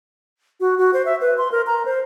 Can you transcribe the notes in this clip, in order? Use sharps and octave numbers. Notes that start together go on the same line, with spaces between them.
F#4
F#4
C5
E5
B4
C6
A#4
A#5
C5